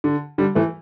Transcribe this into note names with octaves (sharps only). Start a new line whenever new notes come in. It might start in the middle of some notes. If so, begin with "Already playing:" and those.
D3
D3 G3
E3 A3